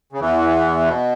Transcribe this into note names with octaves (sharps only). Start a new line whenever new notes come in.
C#3
E2 E3
B2